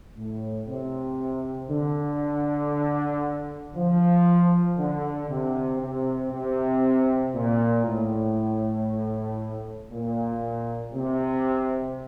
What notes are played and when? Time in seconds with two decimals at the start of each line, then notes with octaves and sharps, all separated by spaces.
0.15 A2
0.67 C3
1.70 D3
3.75 F3
4.77 D3
5.29 C3
5.81 C3
6.32 C3
7.34 A#2
7.86 A2
9.91 A#2
10.94 C3